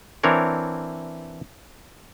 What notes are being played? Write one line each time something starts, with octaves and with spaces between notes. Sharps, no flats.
E3 C4 D4 A#4 C#5